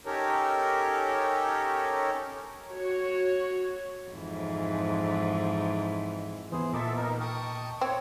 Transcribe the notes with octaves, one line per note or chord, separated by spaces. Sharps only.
C#4 D#4 G4 A4 A#4 C#5
F#4 C#5
F2 G#2 E3
E3 B3 E4 G#4 C5
A#2 A#3 B3 A4 D#5 E5 D6
D#4 A#4
G5 A5 C#6 D#6
C4 C#5